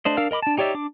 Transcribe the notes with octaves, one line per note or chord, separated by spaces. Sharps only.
A3 D4 C5 D#5
D4 A#4 F5 E6 F6
A#4 D#5 B5 D6
D4 A5
D#4 G4 C#5 D5 E5
D4 D6